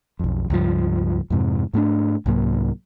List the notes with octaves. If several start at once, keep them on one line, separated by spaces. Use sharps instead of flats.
B1 F2
C#2 G2 F3
F2 G#2 C3
G#2 A3 B3 D4
C2 G#2 F#3 A#3